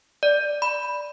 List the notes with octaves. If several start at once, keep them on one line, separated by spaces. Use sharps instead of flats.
D5
B5